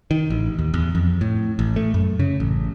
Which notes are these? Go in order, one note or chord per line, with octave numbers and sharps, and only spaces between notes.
D#3
A1
D#2
E2
F2
A2
A1
A3
F#2
C#3
A1